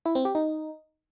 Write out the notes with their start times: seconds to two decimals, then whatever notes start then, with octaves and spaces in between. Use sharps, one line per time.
0.06 E4
0.15 C4
0.25 G4
0.35 D#4